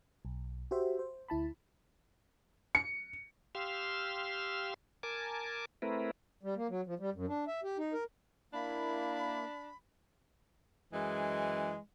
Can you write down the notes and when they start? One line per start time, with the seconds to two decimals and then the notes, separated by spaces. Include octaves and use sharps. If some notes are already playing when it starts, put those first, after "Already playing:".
0.25 B1
0.71 F#4 G4 C5 E5
0.99 C5
1.28 D2 E4 A5 B5
2.75 C#7
3.55 G4 F5 C6 E6 F6
5.03 A#4 G#5 A5 D6
5.82 A3 C4 E4 A#4 B4
6.43 G3
6.56 A#3
6.69 F#3
6.87 F3
6.99 G3
7.14 F#2
7.28 D4
7.48 E5
7.63 G4
7.78 D#4
7.93 A#4
8.53 A#3 D4 E4 B5
10.92 F#2 E3 G#3